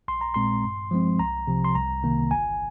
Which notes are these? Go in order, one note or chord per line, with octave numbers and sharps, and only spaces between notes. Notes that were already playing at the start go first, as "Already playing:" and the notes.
A#1 C6
A#5
A#2 G#3 C4 C6
G2
F3 G#3 C4
C2 A#5
C3 F3
C6
C2 A#5
C3 D#3 A#3
G1 G#5